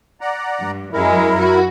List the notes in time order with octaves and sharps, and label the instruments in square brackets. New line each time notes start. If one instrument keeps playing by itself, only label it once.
[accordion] D5 F#5 A#5
[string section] G2
[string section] F#2 G#3 [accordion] E4 A#4
[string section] F#4